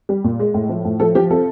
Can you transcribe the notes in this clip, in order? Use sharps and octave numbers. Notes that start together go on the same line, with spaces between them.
G3
A#2
G#3
A2
F3
A2
F3 A4
F3 G4
C3 A4